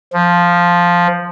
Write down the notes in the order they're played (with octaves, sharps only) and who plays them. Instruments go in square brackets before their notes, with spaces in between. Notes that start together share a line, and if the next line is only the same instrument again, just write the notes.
[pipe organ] F3